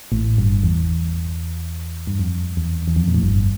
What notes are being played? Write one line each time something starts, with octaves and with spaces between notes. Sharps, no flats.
A1 A2
G1 G2
E2
G2
F2
E2
E2
F2
A#2
A2
G1 G2